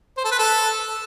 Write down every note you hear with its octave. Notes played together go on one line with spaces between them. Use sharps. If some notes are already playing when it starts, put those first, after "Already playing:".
C5
A4
B4
A4